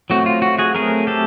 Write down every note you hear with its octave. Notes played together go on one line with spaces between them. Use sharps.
F#3 A3 C4 F#4
F4
F#4
F#4 G#4
F#3 A3 C4 G#4 A#4
G4 A4